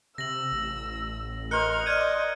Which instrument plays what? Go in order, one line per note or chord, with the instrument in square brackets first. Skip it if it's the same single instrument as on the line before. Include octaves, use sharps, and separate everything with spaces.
[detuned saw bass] C3 [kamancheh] E6 [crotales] A#6 F#7
[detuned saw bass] A1
[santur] A#4 C5 C6 [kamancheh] D#5 F6 [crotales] F#6 C#7 G7
[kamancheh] D5 D#5 [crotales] F6 G#6 D#7